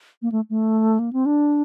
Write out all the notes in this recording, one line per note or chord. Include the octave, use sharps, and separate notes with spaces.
A#3
A3
A3
A#3
C4
D4